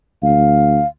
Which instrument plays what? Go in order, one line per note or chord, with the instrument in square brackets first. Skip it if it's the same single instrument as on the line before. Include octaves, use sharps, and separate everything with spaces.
[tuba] D2 [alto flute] F5